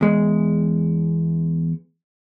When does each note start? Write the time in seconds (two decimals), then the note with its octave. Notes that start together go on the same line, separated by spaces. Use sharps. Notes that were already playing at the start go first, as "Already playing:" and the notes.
0.01 E2 G#3